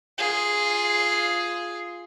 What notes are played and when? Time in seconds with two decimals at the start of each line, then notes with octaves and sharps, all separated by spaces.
0.18 F4 G#4